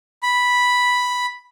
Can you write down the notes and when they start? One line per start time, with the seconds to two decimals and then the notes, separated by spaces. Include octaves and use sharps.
0.23 B5